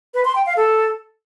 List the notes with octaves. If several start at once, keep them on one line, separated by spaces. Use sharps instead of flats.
B4
C6
G5
F5
A4